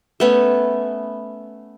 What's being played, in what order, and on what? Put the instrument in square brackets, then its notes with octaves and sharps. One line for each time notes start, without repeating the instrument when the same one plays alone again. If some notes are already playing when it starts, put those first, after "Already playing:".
[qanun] A3 B3 C#4